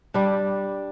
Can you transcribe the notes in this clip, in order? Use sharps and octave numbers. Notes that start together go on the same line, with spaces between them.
G3 D4